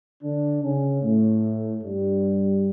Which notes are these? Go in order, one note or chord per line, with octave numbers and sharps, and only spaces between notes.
D3 D4
C#3 C#4
A2 A3
G2 G3